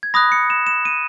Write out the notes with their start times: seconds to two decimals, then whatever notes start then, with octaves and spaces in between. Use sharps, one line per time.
0.03 G#6
0.14 B5 D#6 F#6 A#6
0.32 C#7
0.50 E7
0.67 E7
0.85 D#7